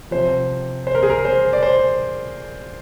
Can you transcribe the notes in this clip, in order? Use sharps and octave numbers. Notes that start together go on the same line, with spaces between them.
C3 F3 C5
C5
A#4
G#4
A#4
C5
D5
C5